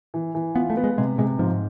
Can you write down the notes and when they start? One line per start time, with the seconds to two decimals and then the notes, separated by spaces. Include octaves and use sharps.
0.14 E3
0.35 E3
0.55 B3 F4
0.70 A3
0.77 B3
0.84 G#3
0.98 C3 G#3
1.18 C3 G#3
1.39 G#2 F3